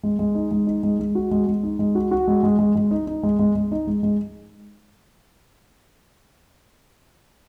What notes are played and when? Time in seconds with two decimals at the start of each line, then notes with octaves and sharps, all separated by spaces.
0.03 G#3
0.19 G#3
0.35 D#4
0.51 G#3
0.67 D#4
0.83 G#3
1.00 G#3
1.15 F#4
1.31 G#3
1.47 G#3
1.63 D#4
1.79 G#3
1.95 F#4
2.11 F#4
2.28 G#3
2.43 G#3
2.59 G#3
2.75 G#3
2.91 D#4
3.07 D#4
3.23 G#3
3.39 G#3
3.55 G#3
3.72 D#4
3.87 G#3
4.03 G#3